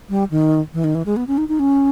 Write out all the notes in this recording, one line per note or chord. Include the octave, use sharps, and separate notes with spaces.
G3
D#3
E3
D#3
E3
G#3
B3
C#4
D#4
D#4
C#4